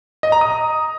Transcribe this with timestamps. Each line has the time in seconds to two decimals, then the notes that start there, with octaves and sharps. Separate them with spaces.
0.23 D#5
0.32 A#5
0.41 D#6